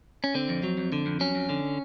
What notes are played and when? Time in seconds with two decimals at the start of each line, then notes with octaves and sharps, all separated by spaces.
0.24 C#4
0.34 D3 C4
0.49 F2
0.63 F#3
0.77 F2
0.92 D3
1.06 F2
1.20 F#3 C#4
1.35 F2
1.49 D3